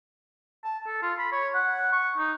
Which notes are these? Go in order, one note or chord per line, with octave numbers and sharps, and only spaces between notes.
A5
A4
F4
B5
C#5
F#5
C#6
D#4